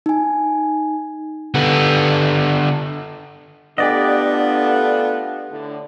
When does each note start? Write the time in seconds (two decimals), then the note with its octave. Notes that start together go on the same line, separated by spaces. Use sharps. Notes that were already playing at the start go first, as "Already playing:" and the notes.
0.06 D#4 G#5
1.54 D3 B3
3.78 A3 B3 D4 F4 G4 A4 D5 D#5
5.48 A2 D3